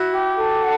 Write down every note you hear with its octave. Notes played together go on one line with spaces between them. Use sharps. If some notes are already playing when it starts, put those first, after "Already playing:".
Already playing: E4 F#4
G4
A4
F#5